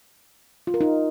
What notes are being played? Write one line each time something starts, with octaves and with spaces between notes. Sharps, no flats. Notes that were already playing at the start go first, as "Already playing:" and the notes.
F4
A#4
D#4